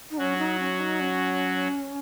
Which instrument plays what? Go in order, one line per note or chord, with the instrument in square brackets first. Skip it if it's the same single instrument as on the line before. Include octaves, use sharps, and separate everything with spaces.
[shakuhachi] D#4
[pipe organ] F#3 F#4 [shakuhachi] C#4
[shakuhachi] D#4
C#4
D#4
C#4